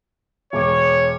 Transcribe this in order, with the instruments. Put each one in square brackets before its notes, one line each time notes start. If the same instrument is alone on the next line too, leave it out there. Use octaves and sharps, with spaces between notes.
[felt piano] E1 D6 [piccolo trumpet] C#5